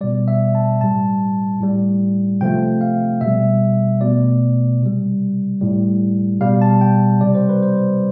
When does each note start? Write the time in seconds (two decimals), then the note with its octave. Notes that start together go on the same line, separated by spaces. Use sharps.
0.01 B2 G3 D5
0.28 E5
0.55 A5
0.81 A2 G3 A5
1.60 A2 G3
2.41 C3 F3 A3 G5
2.81 F5
3.21 B2 G3 E5
4.01 B2 A3 D5
4.81 C3 G3
5.61 A2 G3
6.41 B2 G3 F5
6.62 A5
6.81 G5
7.21 C3 G3 D5
7.35 C5
7.49 B4
7.62 C5